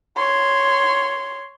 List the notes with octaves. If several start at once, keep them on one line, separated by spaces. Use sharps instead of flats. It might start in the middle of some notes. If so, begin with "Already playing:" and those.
C#5 C6